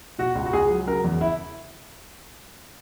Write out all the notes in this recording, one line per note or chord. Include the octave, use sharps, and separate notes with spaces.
B2 F#4
C#2
F#4
C#2 G#4
F#3
C#3 A#4
E2
E4